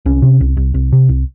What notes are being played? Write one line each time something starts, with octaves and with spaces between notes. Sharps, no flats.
C2 C#4
C3
C2
C2
C2
C3
C2